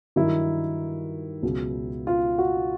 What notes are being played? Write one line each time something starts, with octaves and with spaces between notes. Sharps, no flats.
G2 D#3 F#3 E4
C#2 B2 F#3
F4
F#4